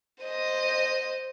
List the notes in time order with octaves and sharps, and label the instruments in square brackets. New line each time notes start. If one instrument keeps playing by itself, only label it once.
[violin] C5 D#5